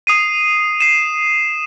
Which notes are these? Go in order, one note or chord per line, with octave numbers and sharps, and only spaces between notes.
D#6 C7 D#7
C7 E7